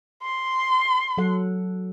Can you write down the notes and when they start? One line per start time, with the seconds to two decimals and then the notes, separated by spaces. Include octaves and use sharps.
0.23 C6
1.18 F#3 A4 F#5